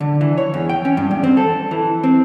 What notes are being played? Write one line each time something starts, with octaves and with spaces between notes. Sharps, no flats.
D3
E3
C#5
E2
G5
C#4
G2
E2
C4
A4
E3
C4